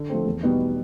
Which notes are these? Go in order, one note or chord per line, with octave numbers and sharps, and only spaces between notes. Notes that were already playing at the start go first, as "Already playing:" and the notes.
Already playing: D3
F3 A3 C4
E2
B2 G3 B3 D#4